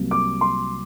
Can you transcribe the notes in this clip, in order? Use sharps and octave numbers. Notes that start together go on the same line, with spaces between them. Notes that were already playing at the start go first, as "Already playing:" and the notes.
Already playing: C2 C3 F#3 A#3
D6
C6